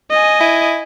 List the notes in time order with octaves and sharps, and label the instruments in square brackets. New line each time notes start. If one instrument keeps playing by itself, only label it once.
[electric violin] D#5 G#5
[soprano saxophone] E4